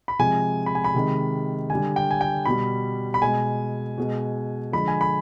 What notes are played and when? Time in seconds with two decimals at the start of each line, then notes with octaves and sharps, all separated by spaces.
0.08 B5
0.19 C3 F3 G#3 G#5
0.66 B5
0.75 G#5
0.84 B5
0.94 C3 D#3 G#3
1.70 D3 G3 G#5
1.96 G5
2.11 G#5
2.21 G5
2.45 B2 G3 B5
3.14 B5
3.22 B2 G#3 G#5
3.98 B2 G#3
4.73 D3 F3 G#3 B5
4.88 G#5
5.01 B5